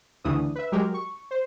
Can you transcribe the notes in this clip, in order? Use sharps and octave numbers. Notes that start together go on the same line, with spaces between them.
D2 C#3 E3 D4 D#6
B4 E5
F#3 G#3 G4 A#4
C#6
C5